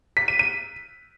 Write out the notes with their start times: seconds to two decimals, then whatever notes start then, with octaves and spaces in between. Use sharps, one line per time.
0.17 B6
0.28 D#7
0.39 D#7